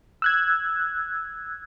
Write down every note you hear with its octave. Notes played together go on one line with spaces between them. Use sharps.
E6 F#6 G#6